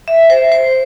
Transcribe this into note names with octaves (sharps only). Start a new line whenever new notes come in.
E5
C5
C5